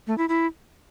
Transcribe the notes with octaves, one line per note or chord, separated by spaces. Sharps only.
A3
E4
E4